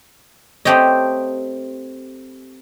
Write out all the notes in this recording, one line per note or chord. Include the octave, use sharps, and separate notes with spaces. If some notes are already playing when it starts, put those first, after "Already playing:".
A3 C4 G4 C#5 D#5